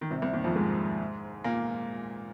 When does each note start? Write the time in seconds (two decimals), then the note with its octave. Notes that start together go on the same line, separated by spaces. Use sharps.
0.01 D#3
0.11 C2 C3
0.22 C2 C3
0.33 D#2 D#3
0.44 F2 F3
0.55 G#2 G#3
1.44 A#2 A#3